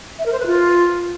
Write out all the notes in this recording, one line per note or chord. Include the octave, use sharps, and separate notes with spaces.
E5
A#4
C5
B4
F4